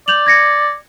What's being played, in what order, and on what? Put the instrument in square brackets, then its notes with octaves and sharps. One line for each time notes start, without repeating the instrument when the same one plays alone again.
[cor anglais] D5 [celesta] G6 F7 F#7
[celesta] G#6 A#6 C#7